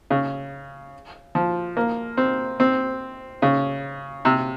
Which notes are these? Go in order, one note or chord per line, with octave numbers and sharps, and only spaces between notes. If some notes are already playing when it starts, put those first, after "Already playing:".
C#3
F3
A#3
C4
C4
C#3
C3